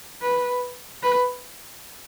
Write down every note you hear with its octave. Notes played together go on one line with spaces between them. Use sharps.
B4
B4